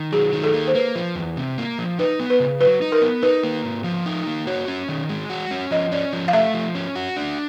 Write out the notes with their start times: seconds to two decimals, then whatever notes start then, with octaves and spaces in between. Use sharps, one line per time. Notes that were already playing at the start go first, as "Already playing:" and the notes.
Already playing: D#3
0.12 F#3 G#4
0.33 D#3
0.44 A4
0.54 A#3
0.67 C5
0.75 A#3 B4
0.95 F3
1.16 E2
1.37 C3
1.58 A#3
1.79 F3
1.99 D#4 B4
2.20 B3
2.30 B4
2.40 C#3
2.61 F#3 B4
2.82 D#4
2.92 A#4
3.02 B3
3.23 D#4 B4
3.43 A#3
3.65 G#2
3.84 F3
4.06 D#4
4.27 A#3
4.47 F#4 C#5
4.68 C#4
4.89 D#3
5.09 G#3
5.30 F#4
5.51 C#4
5.71 F3 D#5
5.92 C#4 D5
6.13 F3
6.28 F5
6.33 A3 E5
6.54 F3
6.75 C#4
6.95 F#4
7.17 D4